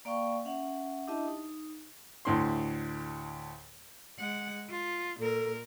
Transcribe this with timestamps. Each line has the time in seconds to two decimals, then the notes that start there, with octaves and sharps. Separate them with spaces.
0.05 A#3 D5 F5 G5 C#6
0.45 C#4 E5 F#5
1.07 D4 E4 G4 D#5 E5 A5
1.28 D#4
2.25 D2 A2 C6
4.19 G#3 F#5
4.69 F4
5.20 A#2 A4 A#4